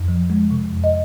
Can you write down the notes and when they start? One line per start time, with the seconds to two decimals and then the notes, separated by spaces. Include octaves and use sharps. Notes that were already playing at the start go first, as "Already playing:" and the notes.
Already playing: F2
0.08 F3
0.30 G#3
0.51 C3
0.72 F2
0.84 D#5